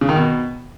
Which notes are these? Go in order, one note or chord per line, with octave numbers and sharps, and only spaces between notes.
C#3
D#3
B2